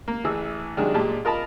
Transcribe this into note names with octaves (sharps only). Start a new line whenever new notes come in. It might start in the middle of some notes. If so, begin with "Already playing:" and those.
A#3
A1 E3 G#4 E6
C3 D#3 F#3 G#3 D4 G#4
A#2 G#3 G4 A5
F4 A#4 D#5 A5 B5